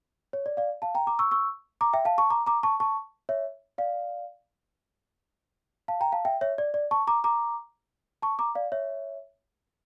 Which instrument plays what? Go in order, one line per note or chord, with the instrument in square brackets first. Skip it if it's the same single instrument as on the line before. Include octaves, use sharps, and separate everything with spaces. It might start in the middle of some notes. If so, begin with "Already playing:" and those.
[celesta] C#5
D5
D5 F5
F5 A5
G5 A#5
A#5 D6
C#6 E6
C#6 E6
A#5 D6
E5 G5
F5 A5
A5 C#6
A#5 D6
A#5 D6
A5 C#6
A5 C#6
C#5 E5
D5 F5
F5 A5
G5 A#5
F5 A5
E5 G5
C#5 E5
D5
D5
A5 C#6
A#5 D6
A#5 D6
A5 C#6
A#5 D6
D5 F5
C#5 E5